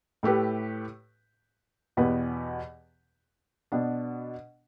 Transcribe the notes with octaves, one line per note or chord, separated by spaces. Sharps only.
A2 A3 G4 B4
E2 B2 B3 G4 B4
B2 B3 D4